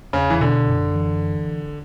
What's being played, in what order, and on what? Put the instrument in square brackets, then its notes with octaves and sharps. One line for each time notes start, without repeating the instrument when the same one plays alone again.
[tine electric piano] E2 [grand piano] C#3
[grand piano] E3
[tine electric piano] B2 [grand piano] D3
[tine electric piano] F#2
E3